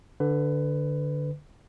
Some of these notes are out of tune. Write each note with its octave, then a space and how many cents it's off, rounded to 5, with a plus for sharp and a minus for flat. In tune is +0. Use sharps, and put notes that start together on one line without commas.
D3 +0 B4 +20